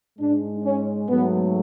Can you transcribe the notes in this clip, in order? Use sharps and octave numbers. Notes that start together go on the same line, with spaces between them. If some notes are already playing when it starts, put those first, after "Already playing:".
G#2 G#3 D4
C#4
G#2 F#3 A3 B3